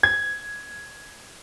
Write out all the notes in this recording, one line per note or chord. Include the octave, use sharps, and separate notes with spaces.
G#6